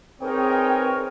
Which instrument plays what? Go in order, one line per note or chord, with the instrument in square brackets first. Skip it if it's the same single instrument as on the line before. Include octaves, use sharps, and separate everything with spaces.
[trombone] C4 [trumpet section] D#4 C#5 [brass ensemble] G#4 B4 G5 [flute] A#4